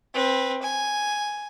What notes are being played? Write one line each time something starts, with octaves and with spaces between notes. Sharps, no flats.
C4 B4
G#5